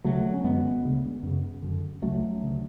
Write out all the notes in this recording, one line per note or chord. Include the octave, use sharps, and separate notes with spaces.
D2 C#3 F#3 A3
C#4
F#2 D3 G#3 B3
D2 C#3
F#2 C#3
F#2 D3
C#2 C#3 F#3 A3
D2 C#3